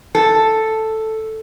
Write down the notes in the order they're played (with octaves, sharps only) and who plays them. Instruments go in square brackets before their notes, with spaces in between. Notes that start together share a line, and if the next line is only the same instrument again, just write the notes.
[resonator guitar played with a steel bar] A4